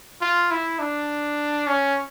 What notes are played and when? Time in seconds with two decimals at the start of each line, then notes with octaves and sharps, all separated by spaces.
0.21 F4
0.51 E4
0.79 D4
1.67 C#4